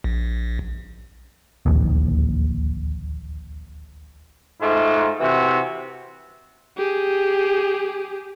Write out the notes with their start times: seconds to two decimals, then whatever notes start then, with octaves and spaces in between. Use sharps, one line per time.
0.04 A#1
1.66 D1 A#1 D#2
4.60 G#2 A3 F4
5.20 C3 E3 F#4
6.78 G4 G#4